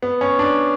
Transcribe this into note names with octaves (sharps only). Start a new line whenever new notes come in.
B3
C#4
D4